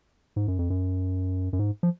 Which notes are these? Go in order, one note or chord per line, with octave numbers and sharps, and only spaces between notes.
G#2
F#2
F2
F#2
F#2
G#2
F3